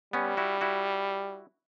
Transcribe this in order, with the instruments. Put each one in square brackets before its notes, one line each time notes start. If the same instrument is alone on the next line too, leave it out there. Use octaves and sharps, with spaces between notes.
[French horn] G3 [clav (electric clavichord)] B3 C#4
[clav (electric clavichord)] E4 F#4
E4 F#4